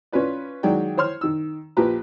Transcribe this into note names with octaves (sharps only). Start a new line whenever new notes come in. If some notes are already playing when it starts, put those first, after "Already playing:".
C#4 F4 B4 D5
D#3 F#3 G#3 D5 G5
C5 C#5 C6 F6
D#3 E6
A#1 F3 G4 B4 A#5